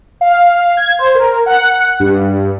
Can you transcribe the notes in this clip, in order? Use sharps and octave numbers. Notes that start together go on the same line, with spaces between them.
F5
G#6
C5
A#4
F#5
G2